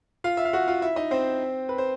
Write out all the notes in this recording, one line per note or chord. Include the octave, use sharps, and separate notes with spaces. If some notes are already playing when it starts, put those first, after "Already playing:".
F4 F5
E5
F5
F#4 F#5
F4 F5
E4 E5
D#4 D#5
C4 C5
B4
C5